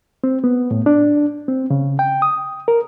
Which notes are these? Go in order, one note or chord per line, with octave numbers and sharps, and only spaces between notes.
C4
B3
A2
D4
C4
C#3
G5
D#6
A#4